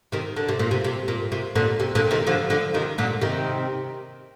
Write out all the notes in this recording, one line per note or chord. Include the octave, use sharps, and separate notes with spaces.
C3 D#3
D3
C3
A#2
C3
C3
A#2
C3
A#2 D3
C3
A#2 D3
C3 D#3
D3 F3
D3 F3
C3 D#3
A#2 D3
C3 D#3